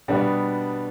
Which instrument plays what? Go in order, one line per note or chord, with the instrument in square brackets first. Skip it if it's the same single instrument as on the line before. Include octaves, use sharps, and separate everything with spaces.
[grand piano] B2 G3 B3 D4